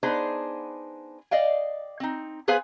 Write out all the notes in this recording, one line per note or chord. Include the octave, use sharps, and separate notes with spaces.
B3 D4 D#4 G#4 C5
D5 D#5 F5 G5
C4 D#4
B3 G#4 B4 C5 F5 G#5